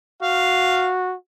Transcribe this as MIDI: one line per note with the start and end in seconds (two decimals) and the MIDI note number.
0.22 1.15 66
0.22 0.90 77